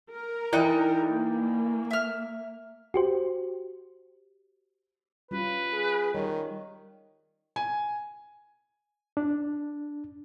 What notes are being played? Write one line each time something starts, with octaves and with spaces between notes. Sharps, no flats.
A#4
E3 D#4 D5 G5 F#6
A#3
E5 F6
F#4 G4 C5
G3 C#4 F4 B4
G#4
D#3 G3 C#5
G#5
D4